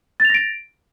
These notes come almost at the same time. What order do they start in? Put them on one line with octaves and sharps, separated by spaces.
A6 F7 A#6 D7